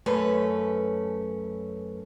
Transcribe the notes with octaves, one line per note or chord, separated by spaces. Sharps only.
F#2 A3 C#4 B4